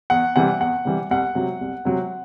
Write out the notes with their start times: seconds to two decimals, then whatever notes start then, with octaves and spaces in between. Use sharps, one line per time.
0.10 E2 F#5
0.36 C3 E3 G3 F#5
0.60 E2 F#5
0.85 C3 E3 G3
1.11 C2 F#5
1.35 C3 F#3
1.61 C2
1.85 C3 F#3